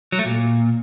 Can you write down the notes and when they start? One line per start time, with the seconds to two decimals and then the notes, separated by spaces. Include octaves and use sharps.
0.12 F#3
0.19 A3
0.25 A#2